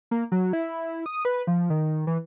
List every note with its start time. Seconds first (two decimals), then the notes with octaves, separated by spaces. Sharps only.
0.11 A#3
0.32 F#3
0.53 E4
1.06 D#6
1.25 B4
1.47 F3
1.70 D#3
2.07 E3